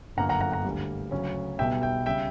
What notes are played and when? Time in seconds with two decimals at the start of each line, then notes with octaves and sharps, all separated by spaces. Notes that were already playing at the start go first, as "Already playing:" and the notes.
0.17 G1 F#2 D3 A#3 F#5 A#5
0.29 F#5 A#5
0.41 F#5 A#5
0.52 F#5 A#5
0.65 D2 D3 G3 A#3
1.11 D2 C#3 F#3 C#4
1.59 B1 B2 G3 B3 E5 G5
1.82 E5 G5
2.06 C#3 G3 E5 G5